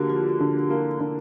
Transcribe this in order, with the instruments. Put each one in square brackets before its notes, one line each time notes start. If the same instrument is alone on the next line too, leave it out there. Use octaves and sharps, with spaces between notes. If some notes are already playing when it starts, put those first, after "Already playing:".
Already playing: [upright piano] D3 A#3 [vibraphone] F#4 G4
[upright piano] F3 [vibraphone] F4
[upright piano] D3
[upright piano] A#3 [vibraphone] E4
[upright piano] D3